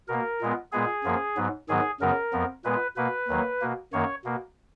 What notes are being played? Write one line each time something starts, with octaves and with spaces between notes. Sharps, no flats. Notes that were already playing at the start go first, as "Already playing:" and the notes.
B2 A#3 A#4
A#2 G#3 B3
A#2 G#3 B3 G#4
F#2 F3 A#3
G#2 F#3 B3
G#2 D#3 F#3 B3 G#4
F#2 C#3 F#3 B3 A#4
F2 F3 B3
A#2 G#3 B3 B4
B2 A#3 B4
D#2 D#3 F#3 A#3
B2 A#3
F#2 D#3 A#3 C#5
B2 A#3